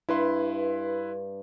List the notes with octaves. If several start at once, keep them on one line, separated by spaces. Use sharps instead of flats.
G2 E4 B4 C6